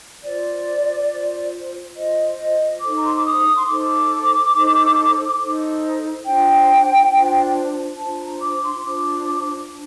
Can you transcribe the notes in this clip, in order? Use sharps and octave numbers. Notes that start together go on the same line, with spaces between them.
F4 C5 D5
F4 C5
F4 C5 D#5
D#5
D#4 A4 C5 D6
A#5
C6
D6
D#6
C6
D#4 A4 C5 D6
D#4 A4 C5
D#4 A4 C5
D4 F4 C5 G5
D4 F4 C5
D4 F4 C5 A5
A#5
D6
C6
D4 F4 C5 D6
D4